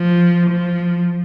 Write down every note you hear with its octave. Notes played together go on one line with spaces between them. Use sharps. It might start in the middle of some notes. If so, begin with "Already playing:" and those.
Already playing: F3
F3